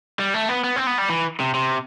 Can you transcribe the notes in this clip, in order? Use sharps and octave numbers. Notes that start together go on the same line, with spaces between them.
G3
A3
B3
B3
C4
B3
G3
E3
C3
C3